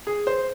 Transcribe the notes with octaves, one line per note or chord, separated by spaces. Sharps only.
G#4
C5